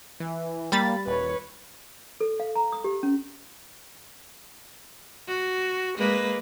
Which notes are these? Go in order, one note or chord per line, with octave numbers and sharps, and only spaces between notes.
E3
G3 A#3 B5 A6
D#1 B4 C#5
A4
F5
A#5
D#6
G4
C#4
F#4
G#3 A#3 B4